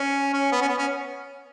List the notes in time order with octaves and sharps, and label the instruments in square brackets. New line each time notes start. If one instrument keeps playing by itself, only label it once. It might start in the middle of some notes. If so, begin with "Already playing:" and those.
Already playing: [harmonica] C#4
C#4
B3
C#4
B3
C#4